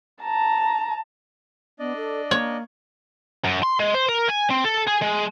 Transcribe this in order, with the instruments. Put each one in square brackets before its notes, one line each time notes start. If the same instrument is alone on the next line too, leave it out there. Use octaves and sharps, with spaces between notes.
[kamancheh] A5 A#5
[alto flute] B3 [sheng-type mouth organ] D4 D5 D#5
[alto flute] A4
[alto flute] A#3 [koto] C#5
[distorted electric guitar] F#2
C6
G#3
C5
A#4
G#5
C4
A4
G#4
G#3